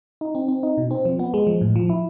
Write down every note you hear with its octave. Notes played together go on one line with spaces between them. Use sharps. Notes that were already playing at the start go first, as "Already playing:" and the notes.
D#4
C4
C4
D#4
B2
C4
F3
B3
G#3
F3
A2
F3
E4